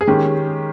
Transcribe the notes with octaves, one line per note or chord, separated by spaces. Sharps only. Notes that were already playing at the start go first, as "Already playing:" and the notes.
G#4
D#3 G#3 C#4 G4